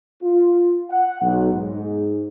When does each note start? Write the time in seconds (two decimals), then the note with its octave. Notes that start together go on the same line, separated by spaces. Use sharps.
0.23 F4
0.91 F#5
1.22 B1
1.53 G#2